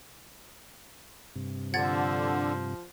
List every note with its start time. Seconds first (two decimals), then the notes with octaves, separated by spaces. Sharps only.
1.36 G2 C3
1.74 D3 F3 F#5 G#6 A6